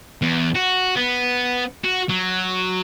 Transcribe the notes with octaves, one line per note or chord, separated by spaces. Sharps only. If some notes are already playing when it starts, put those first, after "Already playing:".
E2
F#4
B3
F#4
F#3